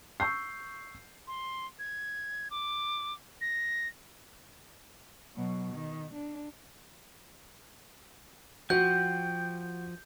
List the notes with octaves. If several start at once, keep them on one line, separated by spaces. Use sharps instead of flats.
C#6 E6 G6 C7
C6
G#6
D6
A#6
B2 F#3
D#3
D4
F3 F#4 G5 G6